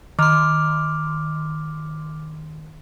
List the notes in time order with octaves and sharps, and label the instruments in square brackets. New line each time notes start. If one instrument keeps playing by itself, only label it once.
[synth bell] D#3 C6 [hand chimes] D6 F6